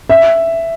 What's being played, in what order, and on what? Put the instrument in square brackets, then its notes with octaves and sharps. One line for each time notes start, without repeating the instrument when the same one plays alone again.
[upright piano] E5